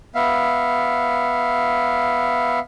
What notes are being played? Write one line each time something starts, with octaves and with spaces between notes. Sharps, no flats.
B3 E5 F5